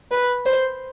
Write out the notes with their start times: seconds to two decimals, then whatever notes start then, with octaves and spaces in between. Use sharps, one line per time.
0.11 B4
0.46 C5